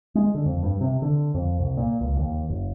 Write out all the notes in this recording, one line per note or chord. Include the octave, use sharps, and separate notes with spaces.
G#3
D3
F2
G2
C3
D3
F2
C2
A#2
C#2
D#2
F#1